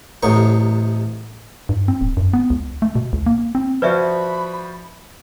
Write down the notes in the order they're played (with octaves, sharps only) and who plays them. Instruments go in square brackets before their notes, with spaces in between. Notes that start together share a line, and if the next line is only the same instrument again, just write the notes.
[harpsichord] A1 A2 C3 B3 D#4 C#6
[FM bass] G2
C4
D1
F#2
B3
C#2
A3
B2
C#2
A#3
C4
[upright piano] F3 F#4 [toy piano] B4 D5 E5 [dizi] B5